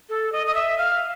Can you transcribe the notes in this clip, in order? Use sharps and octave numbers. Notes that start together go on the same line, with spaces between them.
A4
D#5
D#5
E5
F5